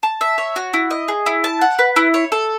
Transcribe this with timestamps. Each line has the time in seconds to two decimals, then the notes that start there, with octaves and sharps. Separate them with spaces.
0.03 A5
0.21 E5
0.38 C#5
0.56 F#4
0.74 E4
0.91 D#5
1.08 G#4
1.26 E4
1.44 A5
1.61 F#5
1.79 B4
1.96 E4
2.14 C#5
2.32 A4